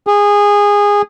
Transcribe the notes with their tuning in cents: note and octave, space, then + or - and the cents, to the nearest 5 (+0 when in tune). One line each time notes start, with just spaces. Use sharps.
G#4 -20